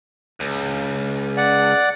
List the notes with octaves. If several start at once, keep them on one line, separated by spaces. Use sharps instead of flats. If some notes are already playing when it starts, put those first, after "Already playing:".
C#2
D5 F#5